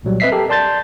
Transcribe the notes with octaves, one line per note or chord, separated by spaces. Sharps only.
C2 A#2 F#3 G3
C4 B4 D#5 E5 B6 C7
G4 A4 A#4
D5 A5 C6 G6 A6